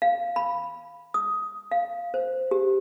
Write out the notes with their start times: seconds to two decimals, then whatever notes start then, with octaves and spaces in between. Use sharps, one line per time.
0.02 F5
0.36 B5
1.14 D#6
1.71 F5
2.14 C5
2.51 G4